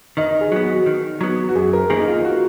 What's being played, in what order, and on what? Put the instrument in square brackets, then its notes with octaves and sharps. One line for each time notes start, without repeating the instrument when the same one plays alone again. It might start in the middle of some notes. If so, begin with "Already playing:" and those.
[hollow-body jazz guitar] D#3 [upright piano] D#5
[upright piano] G#4
[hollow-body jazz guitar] F#3 B3
[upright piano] F#4
[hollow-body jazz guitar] D#3
F#3 B3
[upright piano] F#4
[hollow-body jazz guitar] F#2 [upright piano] G#4
[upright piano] A#4
[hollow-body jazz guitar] D#3 A#3 [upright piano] G#4
[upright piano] D#4
F4
F#4